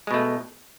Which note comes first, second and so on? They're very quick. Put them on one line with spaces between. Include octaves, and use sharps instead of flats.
G#3 B2 A3